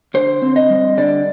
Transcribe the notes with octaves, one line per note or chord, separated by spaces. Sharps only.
D3 C5
C4
D#5
G3
D3 D5